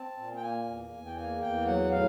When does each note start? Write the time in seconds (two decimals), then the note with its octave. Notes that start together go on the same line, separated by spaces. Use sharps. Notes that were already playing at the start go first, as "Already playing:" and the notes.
Already playing: C4 A5
0.17 A#2
0.36 G5
0.42 A#3 G#5
0.67 E2
0.92 E2
1.06 G5
1.16 A#3 G#5
1.42 E2 G5
1.66 F#3 F#5
1.91 A2 F5